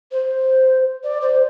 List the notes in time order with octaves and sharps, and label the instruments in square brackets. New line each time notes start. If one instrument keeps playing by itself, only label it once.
[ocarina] C5
D5
C5